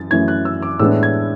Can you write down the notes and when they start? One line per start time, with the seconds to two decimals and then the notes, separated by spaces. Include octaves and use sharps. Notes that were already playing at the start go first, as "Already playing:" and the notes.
Already playing: F#2 E3 A6
0.11 F#2 E3 A3 G#6
0.28 F#6
0.45 E6
0.62 D6
0.79 A2 E3 G#3 B3 D4 E6
1.03 G#6